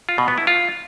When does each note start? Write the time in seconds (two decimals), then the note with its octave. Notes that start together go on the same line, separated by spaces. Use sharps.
0.09 F4
0.18 B2
0.28 B3
0.38 E4
0.47 F4